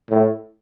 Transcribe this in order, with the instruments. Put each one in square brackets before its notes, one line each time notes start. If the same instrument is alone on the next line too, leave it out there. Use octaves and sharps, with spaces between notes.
[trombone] A2